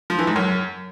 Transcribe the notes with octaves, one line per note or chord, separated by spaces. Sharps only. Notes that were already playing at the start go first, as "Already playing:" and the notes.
F3
E3
G#2
F#2